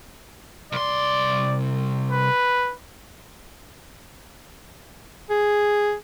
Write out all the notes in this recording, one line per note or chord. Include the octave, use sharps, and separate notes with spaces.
C2 D5 C6
B4
G#4